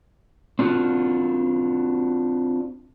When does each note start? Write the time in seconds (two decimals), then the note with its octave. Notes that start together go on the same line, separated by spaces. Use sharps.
0.59 C4 D4 F4 F#4